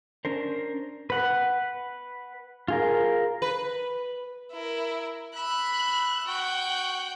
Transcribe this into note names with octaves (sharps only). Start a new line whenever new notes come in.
C#4 D4 A#4 C5
B4 F#5
F4 G#4 A#4
B4
E4 A#4
E5 B5 F#6
F#4 F#5 G5